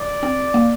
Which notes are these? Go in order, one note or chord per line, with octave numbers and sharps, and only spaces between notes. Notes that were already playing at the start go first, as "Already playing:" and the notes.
Already playing: D5
C4
A#3